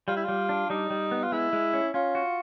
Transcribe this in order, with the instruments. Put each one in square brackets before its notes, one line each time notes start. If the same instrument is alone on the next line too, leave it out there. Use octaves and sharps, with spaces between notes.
[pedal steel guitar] G3 [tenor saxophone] F4
[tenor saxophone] E4
[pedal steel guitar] G3 [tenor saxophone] F4
[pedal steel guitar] D4
[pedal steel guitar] G3 [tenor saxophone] D#4
[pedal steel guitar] G3
B3
[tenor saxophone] F4
[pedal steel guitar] G#3 [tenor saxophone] E4
[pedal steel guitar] G#3
C#4
[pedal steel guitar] C#4 [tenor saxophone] F4
[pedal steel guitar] F#4